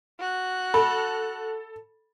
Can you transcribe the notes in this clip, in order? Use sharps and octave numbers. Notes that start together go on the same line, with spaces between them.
F#4 F#6
A4 B5